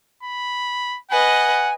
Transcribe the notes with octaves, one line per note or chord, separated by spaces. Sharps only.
B5
B4 D#5 F#5 G#5